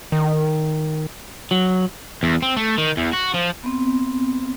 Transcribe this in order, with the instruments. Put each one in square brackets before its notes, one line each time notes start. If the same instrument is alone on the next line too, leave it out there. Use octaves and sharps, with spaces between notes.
[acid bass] D#3
[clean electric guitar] F#3
[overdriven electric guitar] E2
C4
A3
D#3
E2
F#4
F3
[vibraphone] B3 C4